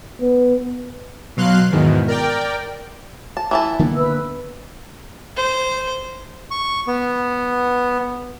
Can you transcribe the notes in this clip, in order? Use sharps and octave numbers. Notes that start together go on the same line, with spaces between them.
B3
B2 F#3 F5 C6 F#6
E2 G#2 B2 D#3
A#4 D5 G5
A5
E3 E4 A5
D3 A#3 B3
B4 E6
C5
C#6
B3